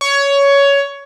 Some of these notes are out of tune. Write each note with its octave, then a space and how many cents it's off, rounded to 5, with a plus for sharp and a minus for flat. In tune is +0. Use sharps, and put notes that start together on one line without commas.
C#5 +15